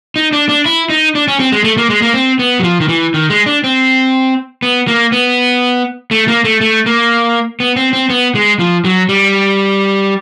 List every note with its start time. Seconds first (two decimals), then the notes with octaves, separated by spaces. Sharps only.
0.16 D#4
0.33 D4
0.49 D4
0.66 E4
0.90 D#4
1.15 D4
1.28 C#4
1.40 C4
1.52 G#3
1.64 A3
1.78 A#3
1.90 G#3
2.02 A#3
2.14 C4
2.39 B3
2.60 F#3
2.63 F3
2.80 D#3
2.88 E3
3.14 D#3
3.30 G#3
3.46 D4
3.64 C4
4.63 B3
4.87 A#3
5.12 B3
6.11 A3
6.28 A#3
6.44 A3
6.61 A3
6.86 A#3
7.60 B3
7.76 C4
7.93 C4
8.10 B3
8.35 G#3
8.59 F3
8.85 F#3
9.09 G3